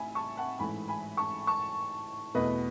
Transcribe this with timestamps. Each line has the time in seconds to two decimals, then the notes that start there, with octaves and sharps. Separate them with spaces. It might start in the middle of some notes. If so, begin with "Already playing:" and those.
Already playing: A1 E5 G#5 B5
0.15 A5 C#6
0.37 F#5 A5
0.59 A1 G#2 E3 A3 G#5 B5
0.88 G#5 B5
1.17 A5 C#6
1.47 A5 C#6
2.35 E2 B2 A3 B4 D#5